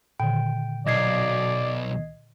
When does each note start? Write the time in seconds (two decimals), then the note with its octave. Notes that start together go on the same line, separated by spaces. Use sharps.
0.20 A#2 D3 D#3 G5
0.87 B1 D5 D#5 G#6 C7